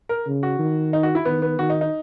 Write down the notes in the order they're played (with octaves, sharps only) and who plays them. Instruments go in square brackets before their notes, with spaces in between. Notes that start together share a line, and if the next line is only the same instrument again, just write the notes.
[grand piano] A#4
[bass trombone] C#3
[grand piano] F#4
[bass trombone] D#3
[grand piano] D#4
F#4
E4
[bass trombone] D#3 [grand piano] B3
[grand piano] B3
[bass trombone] D#3 [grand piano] F#4
[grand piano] D#4
D#4